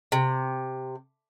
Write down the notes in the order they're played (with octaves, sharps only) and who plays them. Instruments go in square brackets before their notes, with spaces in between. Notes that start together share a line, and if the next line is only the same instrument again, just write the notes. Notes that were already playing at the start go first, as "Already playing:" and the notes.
[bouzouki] C3